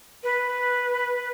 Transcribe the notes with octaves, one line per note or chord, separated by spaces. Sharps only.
B4